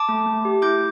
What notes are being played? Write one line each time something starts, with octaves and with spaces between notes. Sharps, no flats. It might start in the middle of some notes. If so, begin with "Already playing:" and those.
Already playing: A5 D6
A3
A3
G4
E4 D6 G6